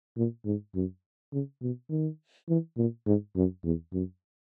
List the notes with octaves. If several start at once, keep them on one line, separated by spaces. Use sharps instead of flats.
A#2
G#2
F#2
C#3
B2
D#3
E3
A#2
G#2
F#2
E2
F#2